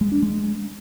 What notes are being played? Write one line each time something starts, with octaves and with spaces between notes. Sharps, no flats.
G#3
D4
G#3